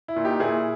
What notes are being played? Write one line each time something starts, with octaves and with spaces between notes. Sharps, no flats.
E4
A#2
D#4 G4
A#2 E4 G#4